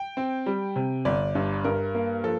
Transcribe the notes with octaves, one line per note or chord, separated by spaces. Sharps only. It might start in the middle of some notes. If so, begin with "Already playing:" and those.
Already playing: G5
C4
G3
C3
G1 D5
G2
G2 A#4
A#3
F3 A4